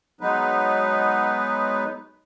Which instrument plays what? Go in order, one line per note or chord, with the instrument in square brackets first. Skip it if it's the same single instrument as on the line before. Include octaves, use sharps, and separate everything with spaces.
[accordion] F#3 G#3 B3 D#4 B4